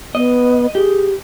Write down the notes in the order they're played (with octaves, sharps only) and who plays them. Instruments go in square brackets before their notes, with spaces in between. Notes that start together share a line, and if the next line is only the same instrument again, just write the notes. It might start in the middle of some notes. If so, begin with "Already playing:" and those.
[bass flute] B3 [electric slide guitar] D#5
[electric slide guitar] G4 [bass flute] G#4